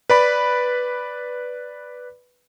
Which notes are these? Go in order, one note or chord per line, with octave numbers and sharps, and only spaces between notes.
B4 D5 B5